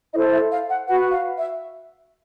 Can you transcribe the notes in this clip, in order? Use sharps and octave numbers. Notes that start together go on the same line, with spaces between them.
E4 A4 C5 D#5
E5
F5
F#5
F#4 B4 F#5
F5
E5